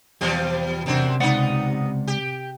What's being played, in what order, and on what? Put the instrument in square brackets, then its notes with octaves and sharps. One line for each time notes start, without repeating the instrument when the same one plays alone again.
[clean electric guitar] E2 [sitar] B2 F3 G3
[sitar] F#2 C4 D4 [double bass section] C3
[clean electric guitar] C#2 D5 F#5 [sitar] B3 D#4
[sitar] G4